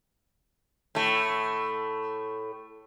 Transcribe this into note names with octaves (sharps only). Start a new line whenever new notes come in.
A2 A3